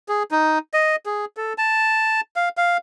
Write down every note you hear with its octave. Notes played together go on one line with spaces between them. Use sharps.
G#4
D#4
D#5
G#4
A4
A5
F5
F5